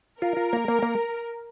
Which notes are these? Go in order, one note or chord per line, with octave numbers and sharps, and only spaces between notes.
F4 A#4
F4
A#3
A#3
A#3